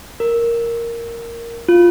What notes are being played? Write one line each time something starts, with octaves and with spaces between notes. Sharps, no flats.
A#4
F4